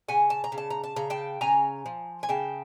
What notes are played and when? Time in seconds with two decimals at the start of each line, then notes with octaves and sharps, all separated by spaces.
0.08 C#3 F#5 G#5
0.30 A5
0.44 A#5
0.52 C#3
0.58 A5
0.70 A#5
0.84 A5
0.96 C#3 A#5
1.10 G5 A5
1.41 C#3 G#5 A#5
1.86 F3
2.23 G#5
2.29 C#3 G5 A5